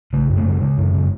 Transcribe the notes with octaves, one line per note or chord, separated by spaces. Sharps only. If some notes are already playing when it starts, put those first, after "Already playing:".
C#3 A3
F#2
A3
C#3 G#3
C#3
F#2
C#3